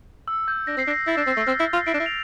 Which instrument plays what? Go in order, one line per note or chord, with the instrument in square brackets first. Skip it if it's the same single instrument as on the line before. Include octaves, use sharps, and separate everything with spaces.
[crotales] E6
G6
[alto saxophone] D4 [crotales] A#6
[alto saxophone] C4 [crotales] C7
[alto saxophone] D4
[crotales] A#6
[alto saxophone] E4 [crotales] A6
[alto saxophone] D4
C4
A3
[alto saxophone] C4 [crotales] F6
[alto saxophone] E4
F4
[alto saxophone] E4 [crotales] D7
[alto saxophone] D4
E4
[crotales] F7